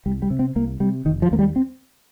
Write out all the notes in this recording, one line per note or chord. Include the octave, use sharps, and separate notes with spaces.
C2 G3
G3
C3
C4
C2 A#3
C3 G3
F1 D#3
F3
D#2 A#3
G3
C4